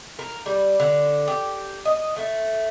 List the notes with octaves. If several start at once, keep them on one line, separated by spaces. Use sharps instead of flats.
A#4
G3
D3
G4
D#5
A3